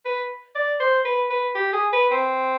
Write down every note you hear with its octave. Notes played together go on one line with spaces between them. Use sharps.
B4
D5
C5
B4
B4
G4
G#4
B4
C4